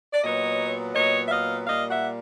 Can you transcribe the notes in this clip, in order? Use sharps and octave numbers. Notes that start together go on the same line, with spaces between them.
D5
A#2 F#3 B3 C#5 D#5
A#2 F#3 B3 C#5 D#5
E5
D#5 F5
A#2 G3 A#3 D#5 F5
E5 F#5